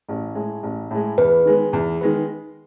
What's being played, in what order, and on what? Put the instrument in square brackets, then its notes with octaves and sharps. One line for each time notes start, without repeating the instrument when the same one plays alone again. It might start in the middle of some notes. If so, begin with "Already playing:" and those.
[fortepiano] A1
A2 G#3
A1
A2 G#3
[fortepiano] E2 [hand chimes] B4
[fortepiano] D#3 G#3 B3
E2
D#3 G#3 B3